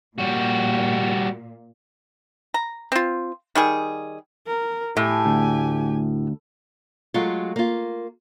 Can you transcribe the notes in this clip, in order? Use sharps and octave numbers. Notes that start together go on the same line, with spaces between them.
A#2 G3 F#4
A#5
C4 F4
D#3 G3 G#4
A#4
A2 G4 G#5
D2
F#3 G#3 A3 F4
A#3 F4